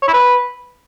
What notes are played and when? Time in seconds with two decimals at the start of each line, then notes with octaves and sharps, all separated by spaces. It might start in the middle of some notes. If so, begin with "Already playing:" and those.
0.02 C#5
0.08 E4
0.13 B4